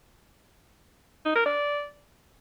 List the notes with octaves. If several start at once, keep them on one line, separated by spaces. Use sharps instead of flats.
D#4
A#4
D5